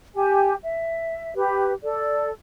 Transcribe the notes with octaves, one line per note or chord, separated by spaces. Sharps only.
G4 G#5
E5
G4 B4
A4 D5